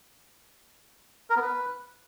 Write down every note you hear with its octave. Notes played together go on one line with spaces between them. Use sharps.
A#4
B3
B4